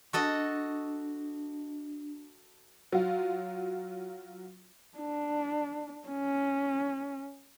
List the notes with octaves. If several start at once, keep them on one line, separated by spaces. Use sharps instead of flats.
D4 F#4 A4 D#5
F#3 F4
D4
C#4